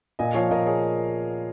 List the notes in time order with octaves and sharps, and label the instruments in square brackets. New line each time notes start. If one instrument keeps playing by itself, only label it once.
[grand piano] A#2 [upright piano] D#5 G#5
[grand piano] F3 [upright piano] C#5 F5
[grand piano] A#2 [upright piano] A#4 D#5
[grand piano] A#3 [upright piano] G#4 C#5